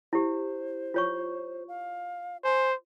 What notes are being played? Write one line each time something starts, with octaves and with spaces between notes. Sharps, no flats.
E4 G4 C5
F4 C#5 C#6
F5
C5 G#5